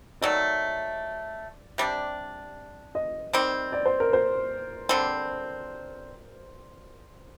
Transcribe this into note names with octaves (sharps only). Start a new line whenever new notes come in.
D#3 F#3 A3 D5
C3 G3 D4
D#5
D#3 G3 C4
D5
C5
A#4
C5
D3 G3 C4